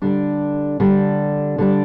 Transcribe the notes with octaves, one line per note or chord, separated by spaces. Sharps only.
D3 G3 D4
D3 G3 D4
D3 G3 D4